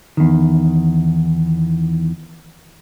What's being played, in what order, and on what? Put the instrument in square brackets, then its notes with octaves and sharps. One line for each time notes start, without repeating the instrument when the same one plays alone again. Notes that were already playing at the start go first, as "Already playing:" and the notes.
[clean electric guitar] E2 D#3